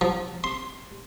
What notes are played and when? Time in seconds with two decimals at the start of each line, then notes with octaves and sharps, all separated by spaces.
0.01 F3
0.44 C6